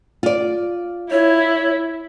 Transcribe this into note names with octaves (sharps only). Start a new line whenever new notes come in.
F4 D5
E4 C#5